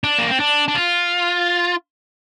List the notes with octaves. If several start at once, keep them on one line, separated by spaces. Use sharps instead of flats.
D4
A#3
C4
D4
D4
F4